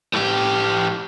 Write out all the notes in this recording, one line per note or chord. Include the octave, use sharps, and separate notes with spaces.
A2 G4